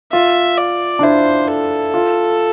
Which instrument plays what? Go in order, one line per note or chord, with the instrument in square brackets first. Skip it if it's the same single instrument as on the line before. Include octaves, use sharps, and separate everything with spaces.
[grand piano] F4 [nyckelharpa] E5
[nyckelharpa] D5
[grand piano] D4
[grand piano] E4 [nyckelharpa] C5
[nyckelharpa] A4
[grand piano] F4